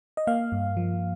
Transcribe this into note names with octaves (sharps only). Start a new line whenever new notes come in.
D#5
A#3 F5
G2
F3